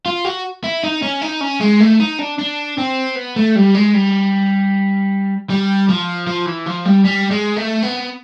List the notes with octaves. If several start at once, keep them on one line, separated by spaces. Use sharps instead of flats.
F4
F#4
E4
D#4
C#4
D#4
C#4
G#3
A3
D#4
D4
D4
C4
B3
A3
G3
G#3
G3
G3
F3
F3
E3
F3
G3
G3
G#3
A3
B3